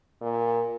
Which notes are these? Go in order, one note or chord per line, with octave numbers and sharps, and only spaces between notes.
A#2